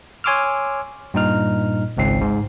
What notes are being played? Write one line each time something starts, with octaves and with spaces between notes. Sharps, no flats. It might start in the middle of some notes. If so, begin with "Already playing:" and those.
C#5 G#5 C6 D6 E6 F6
G2 A#2 D#4 F6
G#1 C#2 G#2 C4 C7
G#2